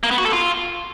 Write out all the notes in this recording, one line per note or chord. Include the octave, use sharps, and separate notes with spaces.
A#3
B3
F#4
A4
F4